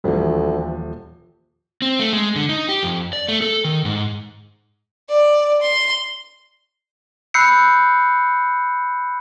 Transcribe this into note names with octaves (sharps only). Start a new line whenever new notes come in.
D#1 D2 E3 F3 G3
C4
A3
G#3
D3
D#4
G4
F2
D5
A3
A4
D#3
G#2
D5
C6
B5 E6 F#6 G6 C7 C#7